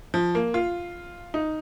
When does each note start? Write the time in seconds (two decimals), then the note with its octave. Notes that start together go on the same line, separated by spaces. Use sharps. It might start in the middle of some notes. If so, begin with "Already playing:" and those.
0.14 F3
0.35 A#3
0.54 F4
1.34 D#4